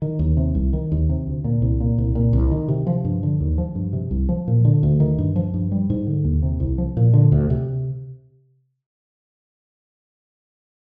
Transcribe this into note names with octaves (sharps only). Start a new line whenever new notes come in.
D#3
D#2
C3
C2
D#3
D#2
C3
D2
A#2
C2
A#2
C2
A#2
C2
D#3
C3
F3
G2
D3
D#2
F3
G2
C3
C2
F3
A#2
D3
D2
D#3
G2
F3
G2
G3
G#2
D3
D#2
C3
C2
F3
A#2
D3
D2
C3